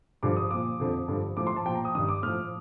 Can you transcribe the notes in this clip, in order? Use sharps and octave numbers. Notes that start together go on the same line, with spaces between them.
G2 D3 F3 D6
D#6
A#2 F3 D6
F2 D3 F3
G2 D3 F3
A2 F3 D6
C6
A5
A#2 F3 G5
A#5
D#6
G2 D#3 D#6
D6
A2 F3 F6